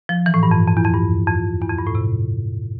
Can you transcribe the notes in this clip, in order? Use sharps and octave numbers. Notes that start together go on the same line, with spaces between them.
F3
E3
A2
G2
F2
F2
E2
F2
G2
F2
E2
F2
G2
A2
C3